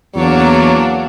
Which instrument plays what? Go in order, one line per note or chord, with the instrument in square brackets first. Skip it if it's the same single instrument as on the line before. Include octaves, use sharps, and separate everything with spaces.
[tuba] E2 [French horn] F#3 [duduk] A#3 [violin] D4 C#5